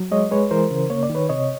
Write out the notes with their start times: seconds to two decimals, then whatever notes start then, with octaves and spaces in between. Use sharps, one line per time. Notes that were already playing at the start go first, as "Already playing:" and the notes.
Already playing: F#3
0.12 G#3 C#5 D#5
0.31 G#3 B4 C#5
0.51 E3 A#4 C5
0.71 C#3
0.90 A#3 C#5
1.03 D5
1.10 D#3
1.15 B4 C#5
1.29 C3 C#5 D#5